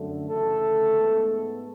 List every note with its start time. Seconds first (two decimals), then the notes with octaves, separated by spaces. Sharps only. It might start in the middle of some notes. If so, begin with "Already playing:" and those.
Already playing: F#2 D3 A3
0.29 D2 C#3 E3 A3 A4
0.98 G#2 G#3 B3